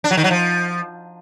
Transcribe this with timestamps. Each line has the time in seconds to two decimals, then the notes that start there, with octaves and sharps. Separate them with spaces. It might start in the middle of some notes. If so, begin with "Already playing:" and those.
0.04 D4
0.11 F#3
0.17 D#3
0.24 F#3
0.31 F3